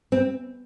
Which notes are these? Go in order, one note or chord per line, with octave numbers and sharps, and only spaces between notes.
C4